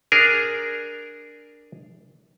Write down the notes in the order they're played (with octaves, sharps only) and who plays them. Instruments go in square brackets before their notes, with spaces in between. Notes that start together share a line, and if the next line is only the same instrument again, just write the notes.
[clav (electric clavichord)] D4 G#4 A#4